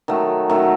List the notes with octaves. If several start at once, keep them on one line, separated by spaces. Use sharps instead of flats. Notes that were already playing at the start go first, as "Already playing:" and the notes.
D#3 F#3 A3
D#3 F#3 A3